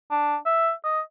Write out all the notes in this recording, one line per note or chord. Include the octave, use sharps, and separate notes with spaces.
D4
E5
D#5